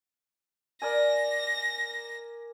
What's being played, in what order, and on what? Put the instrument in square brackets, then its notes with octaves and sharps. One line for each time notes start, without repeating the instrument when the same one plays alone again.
[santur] A#4 D5 G#5 [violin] A#6